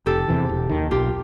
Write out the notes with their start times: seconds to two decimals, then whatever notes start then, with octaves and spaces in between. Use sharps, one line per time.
0.06 F1 G4 A4
0.28 E2 C3 E3
0.49 E1
0.69 D#2 D#3
0.91 B1 F4 G4